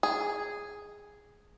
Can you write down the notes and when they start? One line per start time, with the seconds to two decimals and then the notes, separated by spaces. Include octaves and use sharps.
0.03 G#4